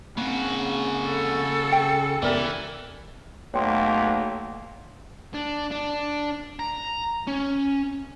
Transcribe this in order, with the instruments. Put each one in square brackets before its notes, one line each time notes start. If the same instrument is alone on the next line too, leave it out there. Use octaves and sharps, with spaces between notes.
[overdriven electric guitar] C#3 F#4 [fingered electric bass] A#3 C4
[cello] A4
[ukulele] G5
[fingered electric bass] C#2 F#2 B3 [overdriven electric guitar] E3 [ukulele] G4 A#4 D5
[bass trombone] B1 [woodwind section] E2 A3 A#3 [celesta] C#5 G5 C6
[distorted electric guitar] D4
D4
A#5
C#4